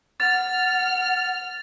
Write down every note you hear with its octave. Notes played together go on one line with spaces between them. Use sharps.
F#5 F6 A6